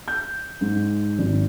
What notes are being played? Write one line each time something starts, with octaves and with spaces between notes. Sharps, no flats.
G6
G#2
G#1